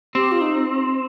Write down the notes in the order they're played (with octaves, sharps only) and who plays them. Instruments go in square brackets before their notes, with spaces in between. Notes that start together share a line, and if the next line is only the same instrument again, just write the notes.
[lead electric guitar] C4 [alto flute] G4
[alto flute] F4
D#4